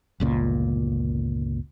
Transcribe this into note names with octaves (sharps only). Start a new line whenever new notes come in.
G1 C#2 A#2